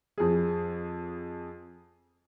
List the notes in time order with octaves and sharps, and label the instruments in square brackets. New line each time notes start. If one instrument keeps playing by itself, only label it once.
[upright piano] F2 G#4